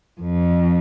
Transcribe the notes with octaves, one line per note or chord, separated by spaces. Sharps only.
F2